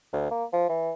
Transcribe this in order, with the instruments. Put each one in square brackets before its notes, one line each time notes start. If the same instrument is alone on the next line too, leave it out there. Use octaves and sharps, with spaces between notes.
[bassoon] D2
A#3
F3
E3